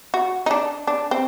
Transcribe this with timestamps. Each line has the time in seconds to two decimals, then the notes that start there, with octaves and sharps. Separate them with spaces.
0.14 F#4
0.46 D#4
0.51 D4
0.87 D4
1.11 C4